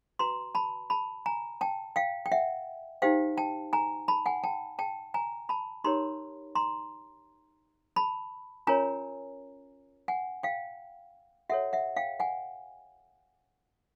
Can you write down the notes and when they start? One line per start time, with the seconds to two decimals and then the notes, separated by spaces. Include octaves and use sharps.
0.19 F#4 B4 A#5 C6
0.55 A5 B5
0.90 A5 B5
1.26 G#5 A#5
1.61 G5 A5
1.96 F5 G5
2.26 G5
2.32 E5 F#5
3.02 D#4 G4 C5 F5 G5
3.37 G5 A5
3.73 G#5 A#5
4.08 A5 B5
4.26 F#5 G#5
4.44 G5 A5
4.79 G5 A5
5.14 G#5 A#5
5.49 A5 B5
5.84 D#4 G4 A#4 C#5 A#5 C6
6.55 A#5 C6
7.96 A5 B5
8.67 C#4 F4 A#4 C#5 G#5 A#5
10.08 F#5 G#5
10.43 F5 G5
11.49 F#4 A4 C#5 E5 F#5
11.73 E5 F#5
11.96 F5 G5
12.20 F#5 G#5